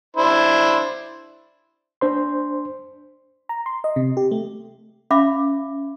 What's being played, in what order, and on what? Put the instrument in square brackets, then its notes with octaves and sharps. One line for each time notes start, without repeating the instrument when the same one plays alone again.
[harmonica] D4 E4 C5
[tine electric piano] D4 C5 C6
[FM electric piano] A#5
C6
D#5
C3
G4
A3
[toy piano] C#4 E5 F5 B5 D6